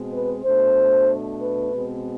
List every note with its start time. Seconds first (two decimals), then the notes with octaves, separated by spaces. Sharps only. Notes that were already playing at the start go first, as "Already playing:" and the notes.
Already playing: B2 G#3 C4
0.12 B4
0.44 B2 A3 D4 C5
1.41 B4
1.72 B2 G#3 C4